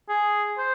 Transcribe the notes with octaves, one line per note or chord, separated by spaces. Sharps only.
G#4
C5